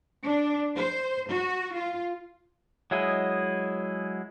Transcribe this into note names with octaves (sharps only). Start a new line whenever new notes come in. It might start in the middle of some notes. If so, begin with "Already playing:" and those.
D4
C5
F#4
F4
F#3 G#3 E4 G#4 D#5